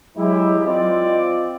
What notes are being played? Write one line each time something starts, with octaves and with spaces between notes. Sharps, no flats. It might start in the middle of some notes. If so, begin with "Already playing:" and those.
F#3 G#3 E4 G4
C4 F4 D5 D#5